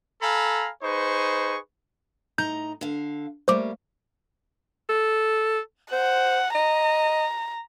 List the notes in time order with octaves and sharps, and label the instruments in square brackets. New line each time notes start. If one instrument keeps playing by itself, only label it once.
[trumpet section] A4 F5 G#5 A#5 B5
D#4 G#4 B4 C5 C#6
[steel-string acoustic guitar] A2 D#4 A#5 [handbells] G6
[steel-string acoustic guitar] D3 F5
[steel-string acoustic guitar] G3 A3 A#3 [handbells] C5 D6
[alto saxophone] A4
[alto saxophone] C5 [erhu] F#5
[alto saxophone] D#5 [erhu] A#5